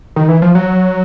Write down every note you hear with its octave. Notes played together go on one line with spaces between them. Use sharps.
D#3
E3
F3
F#3